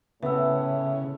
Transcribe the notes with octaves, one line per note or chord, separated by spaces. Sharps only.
A2 C#3 B3 E5 E6